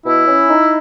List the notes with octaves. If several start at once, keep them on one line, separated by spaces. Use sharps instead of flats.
B2 E4
C#4
D#4